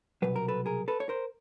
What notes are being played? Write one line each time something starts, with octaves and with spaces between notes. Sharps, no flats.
C2 B2 F#3 B4
A#4
A4 B4
G#4 A#4
A4 B4
C#5
A#4 C5